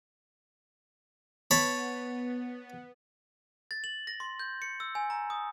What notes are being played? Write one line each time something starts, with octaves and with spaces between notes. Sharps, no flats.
B3 C#5 A5 B5
A6
F#7
A#6
C6
G6
C#7
E6
G#5
A#5
D#6